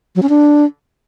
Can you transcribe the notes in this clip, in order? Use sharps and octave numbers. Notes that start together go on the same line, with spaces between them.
F#3
C#4
D4